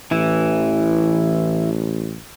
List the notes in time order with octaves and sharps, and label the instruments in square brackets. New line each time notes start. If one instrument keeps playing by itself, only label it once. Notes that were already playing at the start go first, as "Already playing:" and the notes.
[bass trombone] A1 [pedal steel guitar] E3 E4